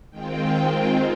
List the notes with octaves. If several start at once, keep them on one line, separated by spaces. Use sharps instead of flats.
D#3 G#3 C4 F4 G5